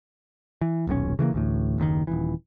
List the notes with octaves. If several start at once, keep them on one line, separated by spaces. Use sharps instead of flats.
E3
D#1 B1 B2 C#4
C#3 E3 G#3 A#3
A1 D2 A2
F#1 D#2 C3 D#3
D#1 G#1 E3